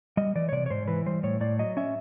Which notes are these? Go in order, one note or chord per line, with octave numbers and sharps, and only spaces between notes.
G3 D#5
E3 D5
C#5
C3 D5
C#5
G#2 C5
E3 B4
G3 C5
A2 C#5
A2 D5
F#3 D#5
C#4 E5